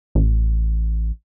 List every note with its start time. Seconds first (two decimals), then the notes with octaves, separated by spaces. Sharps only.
0.15 A1